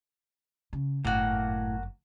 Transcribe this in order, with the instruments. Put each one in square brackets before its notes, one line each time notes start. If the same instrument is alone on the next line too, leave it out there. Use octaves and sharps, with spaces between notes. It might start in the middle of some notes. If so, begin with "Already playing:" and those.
[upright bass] C#3
[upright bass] G1 F#2 [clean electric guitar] A2 [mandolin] A#3 F#4